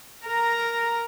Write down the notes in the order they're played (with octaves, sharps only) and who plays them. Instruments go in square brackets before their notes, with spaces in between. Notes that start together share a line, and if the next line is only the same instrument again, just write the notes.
[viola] A#4 A#5